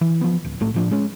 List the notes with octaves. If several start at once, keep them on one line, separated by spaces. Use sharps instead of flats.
E3
F3 B3
D1
B1 A2 A3
A2 F3 D4
G#3 C#4